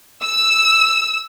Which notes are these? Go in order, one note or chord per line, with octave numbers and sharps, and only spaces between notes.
E6